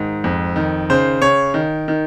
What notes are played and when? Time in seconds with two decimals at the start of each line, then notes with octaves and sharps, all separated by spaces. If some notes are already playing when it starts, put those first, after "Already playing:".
Already playing: G#2 D#3
0.24 F2
0.56 D#3
0.90 C#3 C5
1.21 C#3 C#5
1.54 D#3
1.88 D#3